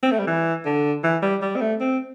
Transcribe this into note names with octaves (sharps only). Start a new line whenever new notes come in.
C4
A3
G3
E3
D3
E3
G3
G3
C4
A3
C4